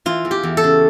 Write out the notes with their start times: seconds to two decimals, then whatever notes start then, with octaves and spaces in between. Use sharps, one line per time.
0.06 E3 F4
0.25 E2
0.31 G4
0.43 E2
0.57 A4
0.64 C#3